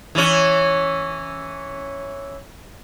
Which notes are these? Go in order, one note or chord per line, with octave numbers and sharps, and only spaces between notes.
E3 C#4